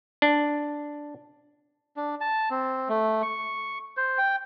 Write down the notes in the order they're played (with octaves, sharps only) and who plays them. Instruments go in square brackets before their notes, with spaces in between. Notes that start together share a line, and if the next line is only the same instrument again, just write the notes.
[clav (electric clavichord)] D4
[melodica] D4
A5
C4
A3
C#6
C5
G5